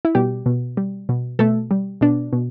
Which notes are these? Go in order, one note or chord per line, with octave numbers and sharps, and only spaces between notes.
E4
B2 G3 G4
B2
G3
B2
B2 A3 A4
G3
B2 D4
B2